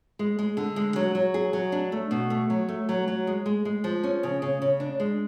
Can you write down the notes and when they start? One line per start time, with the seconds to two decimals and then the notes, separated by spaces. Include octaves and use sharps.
0.19 G#3
0.39 G#3
0.57 D3
0.76 G#3
0.96 F#3
1.15 F#3
1.34 G#4
1.53 F#3
1.72 D4
1.92 A3
2.11 B2
2.30 A3
2.50 F#3
2.69 A3
2.89 F#3
3.08 F#3
3.27 G#3
3.46 G#3
3.65 G#3
3.84 F3
4.03 C#4
4.23 C#3
4.42 C#3
4.62 C#3
4.80 D4
5.00 G#3